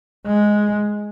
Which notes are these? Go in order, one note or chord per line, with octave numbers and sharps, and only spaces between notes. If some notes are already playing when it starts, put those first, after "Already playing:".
G#3